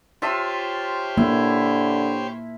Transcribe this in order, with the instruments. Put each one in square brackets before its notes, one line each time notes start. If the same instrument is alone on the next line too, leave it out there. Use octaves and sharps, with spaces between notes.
[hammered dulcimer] F4 E5 A5 [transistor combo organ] G4 C5 C#5
[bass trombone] D3 [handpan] A#3 [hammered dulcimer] E4